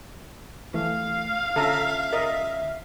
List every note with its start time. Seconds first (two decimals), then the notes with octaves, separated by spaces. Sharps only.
0.74 E3 A3 F5
1.56 D3 C#4 F4 A4 E5 A#5
2.13 A#4 D#5